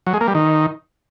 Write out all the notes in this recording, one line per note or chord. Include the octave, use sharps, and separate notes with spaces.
F#3
G#3
A#3
G3
D#3